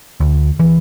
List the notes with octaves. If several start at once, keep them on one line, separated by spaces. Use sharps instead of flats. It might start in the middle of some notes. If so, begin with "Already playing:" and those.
D2
E3